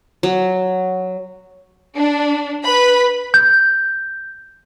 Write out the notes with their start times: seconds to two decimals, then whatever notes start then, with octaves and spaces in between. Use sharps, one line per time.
0.23 F#3
1.96 D4
2.64 B4 B5
3.34 G6